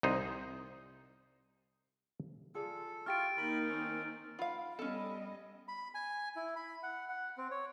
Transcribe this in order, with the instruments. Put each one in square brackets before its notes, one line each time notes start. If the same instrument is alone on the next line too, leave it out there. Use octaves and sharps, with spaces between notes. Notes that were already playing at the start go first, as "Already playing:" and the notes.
[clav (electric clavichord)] C2 D#4 C5
[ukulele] F4 G#4 D5 [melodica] A4
[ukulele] E4 G4 [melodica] F4 C#6 [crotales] F6 A6 D7
[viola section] D#3 A#3 D#4 [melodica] A#4 B5
[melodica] C4 C#4
[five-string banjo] F4 F5 [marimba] F#5 [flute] B5
[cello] G3 D#5 [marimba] B3 [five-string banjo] C#4 A4
[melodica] B5
G#5
E4
B5
F#5
F#5
C4
C#5